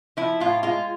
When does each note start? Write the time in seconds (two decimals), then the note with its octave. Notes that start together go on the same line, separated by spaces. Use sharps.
0.17 F3 E4
0.40 A2 F4
0.63 G#3 F4